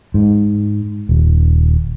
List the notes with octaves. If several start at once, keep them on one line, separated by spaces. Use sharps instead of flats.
G#2
D#1